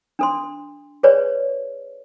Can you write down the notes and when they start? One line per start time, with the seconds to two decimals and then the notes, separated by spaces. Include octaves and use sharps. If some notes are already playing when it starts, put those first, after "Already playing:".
0.19 D4 A4 C6
1.03 G#4 B4 C#5 D5